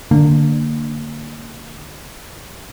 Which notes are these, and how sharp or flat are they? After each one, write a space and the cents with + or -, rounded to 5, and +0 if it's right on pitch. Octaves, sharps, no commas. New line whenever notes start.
D3 +15 A#3 -25 D4 +0